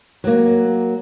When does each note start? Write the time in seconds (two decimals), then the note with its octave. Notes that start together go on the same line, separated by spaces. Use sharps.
0.24 F#3 A#3